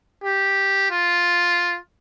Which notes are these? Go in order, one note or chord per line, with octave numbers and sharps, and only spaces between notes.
G4
F4